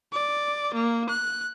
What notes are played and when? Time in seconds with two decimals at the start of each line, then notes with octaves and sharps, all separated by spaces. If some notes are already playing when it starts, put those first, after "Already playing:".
0.12 D5
0.74 A#3
1.09 F#6